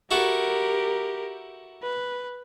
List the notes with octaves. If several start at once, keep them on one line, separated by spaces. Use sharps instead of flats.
E4 F#4 G4 A4 A#4
B4